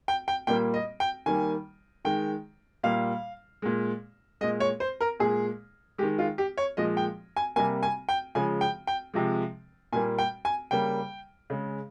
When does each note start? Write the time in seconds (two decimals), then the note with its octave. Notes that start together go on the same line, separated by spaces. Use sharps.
0.08 G5
0.28 G5
0.47 A#2 G3 A#3 G5
0.74 D#5
1.00 G5
1.26 D#3 G3 A#3 G#5
2.05 D#3 G#3 G5
2.83 A#2 G3 A#3 F5
3.62 A#2 G#3
4.41 A#2 G#3 D#5
4.60 C#5
4.80 C5
5.01 A#4
5.20 A#2 G#3 G#4
5.98 G#3 G4
6.03 D#3
6.19 F4
6.38 G4
6.58 C#5
6.77 A#2 F3 G#3 D#5
6.97 G5
7.36 G#5
7.56 C3 G3 A#3 G#5
7.83 G#5
8.09 G5
8.35 C#3 F3 G#3 G#5
8.61 G5
8.87 G5
9.14 C3 F3 G#3
9.93 A#2 G3 A#3 G#5
10.19 G5
10.45 G#5
10.71 C#3 G3 A#3 G5
11.50 C#3 G#3